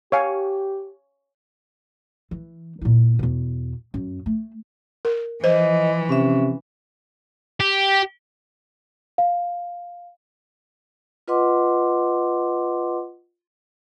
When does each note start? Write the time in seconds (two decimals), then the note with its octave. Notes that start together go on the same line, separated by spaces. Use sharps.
0.12 G4 C#5 F5 G#5
2.31 E3
2.81 A#2 E4
3.19 E2 B2
3.94 F#2
4.26 A3
5.05 A#4
5.44 E3 F3 C5 D#5
6.09 C3 C#4 E5
7.60 G4
9.18 F5
11.28 F4 B4 D#5 F#5 C6 D6